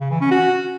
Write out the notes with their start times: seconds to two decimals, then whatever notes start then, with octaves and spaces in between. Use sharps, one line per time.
0.01 C#3
0.11 E3
0.21 C#4
0.31 F#4